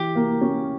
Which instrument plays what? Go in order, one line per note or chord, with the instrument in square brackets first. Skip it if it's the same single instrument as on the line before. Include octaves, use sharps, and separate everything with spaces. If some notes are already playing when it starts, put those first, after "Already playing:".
Already playing: [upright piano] E3 [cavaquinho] G4
[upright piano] A#3
C#4